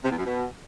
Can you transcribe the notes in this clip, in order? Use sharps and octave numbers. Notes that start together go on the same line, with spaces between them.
C3
E2
F#2
B2